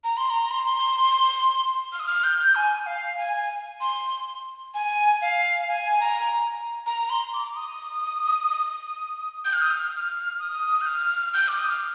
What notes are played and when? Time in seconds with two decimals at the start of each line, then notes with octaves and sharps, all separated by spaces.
0.04 A#5
0.17 C6
0.30 A#5
0.51 C6
1.92 F6
2.00 D#6
2.06 F6
2.24 G6
2.55 G#5
2.86 F5
3.18 G#5
3.81 C6
4.74 G#5
5.22 F5
5.68 G#5
6.00 A#5
6.86 A#5
7.10 C6
7.33 D6
7.56 D#6
9.45 G6
9.53 F6
9.62 D#6
9.71 F6
10.40 D#6
10.81 G6
10.86 F6
11.34 G6
11.48 D6
11.59 D#6
11.70 F6